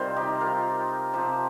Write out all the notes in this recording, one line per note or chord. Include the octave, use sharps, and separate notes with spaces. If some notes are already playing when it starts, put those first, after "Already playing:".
Already playing: C3 D#3 G3 C4 F4 A#4 C5
D#4 G4
F4 A#4
C3 F3 C4 G4 C5